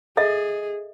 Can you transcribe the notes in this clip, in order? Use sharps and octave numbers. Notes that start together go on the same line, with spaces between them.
G#4 A4 D#5 E5